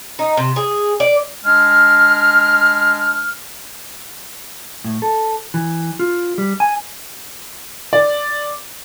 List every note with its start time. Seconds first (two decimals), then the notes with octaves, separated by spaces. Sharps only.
0.19 D#4
0.37 C3
0.56 G#4
1.00 D5
1.45 G#3 D4 F6
4.84 A2
5.02 A4
5.54 E3
6.00 F4
6.38 G3
6.60 G#5
7.93 D5